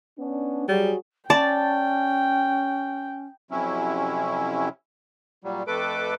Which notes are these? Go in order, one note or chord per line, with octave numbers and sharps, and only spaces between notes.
B3 C#4 D4
F#3 G3 G#4
C#4 D5 G5 A5
F2 C3 F#3 C#4 E4
A#2 F#3 G3
F2 A3 A4 B4 D6